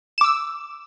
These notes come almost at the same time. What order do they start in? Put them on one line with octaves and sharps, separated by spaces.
E7 D6 E6